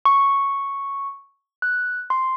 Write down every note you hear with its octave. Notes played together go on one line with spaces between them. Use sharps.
C#6
F#6
C6